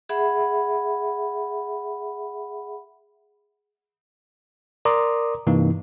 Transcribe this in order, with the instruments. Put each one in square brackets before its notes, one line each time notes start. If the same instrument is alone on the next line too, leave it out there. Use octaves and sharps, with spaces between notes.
[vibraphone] G#4 E5 F#5 B5
[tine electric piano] A#4 D5 A#5 C6 D6 D#6
G2 C3 E3 A#3 D#4